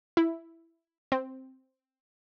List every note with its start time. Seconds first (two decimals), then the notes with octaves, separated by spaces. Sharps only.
0.17 E4
1.12 C4